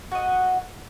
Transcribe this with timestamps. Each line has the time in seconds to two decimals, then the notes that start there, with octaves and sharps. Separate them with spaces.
0.11 F#4
0.15 D#5
0.18 F#5